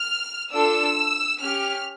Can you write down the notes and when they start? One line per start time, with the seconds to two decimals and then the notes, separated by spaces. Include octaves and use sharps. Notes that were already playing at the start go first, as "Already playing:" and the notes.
Already playing: F6
0.51 D4 F4 A4 E6
1.40 C#4 G4 F6